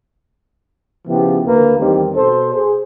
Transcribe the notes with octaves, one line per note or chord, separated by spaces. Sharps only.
C#3 F3 B3 E4 G4
D2 A#3 B4
E2 D#3 G3 C4 G4
B2 A4 C5
G#4 C5